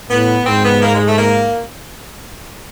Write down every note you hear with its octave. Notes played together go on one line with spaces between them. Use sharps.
A2 B3
G#2 C4
B3
A#3
G#3
A3
A#3